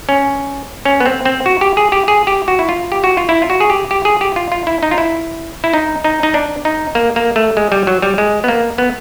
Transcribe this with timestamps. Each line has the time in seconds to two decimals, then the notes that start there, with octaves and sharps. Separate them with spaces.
0.09 C#4
0.85 C#4
1.00 B3
1.06 C4
1.25 C4
1.46 F#4
1.61 G4
1.77 G#4
1.92 G4
2.08 G#4
2.27 G4
2.48 F#4
2.59 E4
2.69 F4
2.92 G4
3.04 F#4
3.17 F4
3.29 E4
3.42 F4
3.50 F#4
3.60 G#4
3.70 G4
3.91 G4
4.05 G#4
4.21 G4
4.36 F4
4.52 F4
4.67 E4
4.83 D#4
4.91 F4
4.98 E4
5.64 E4
5.74 D#4
6.04 D#4
6.23 D#4
6.34 D4
6.65 D#4
6.95 A#3
7.16 A#3
7.36 A3
7.57 G#3
7.72 G3
7.87 F#3
8.02 G3
8.18 G#3
8.44 B3
8.48 A#3
8.78 B3